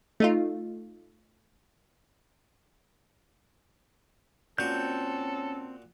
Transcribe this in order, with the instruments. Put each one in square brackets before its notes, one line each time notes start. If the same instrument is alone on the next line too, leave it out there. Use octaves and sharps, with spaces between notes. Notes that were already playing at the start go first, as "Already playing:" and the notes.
[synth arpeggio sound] A3 D#4 F4
[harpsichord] A#2 F#4 [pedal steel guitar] C4 G6 [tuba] C#4 [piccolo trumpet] A4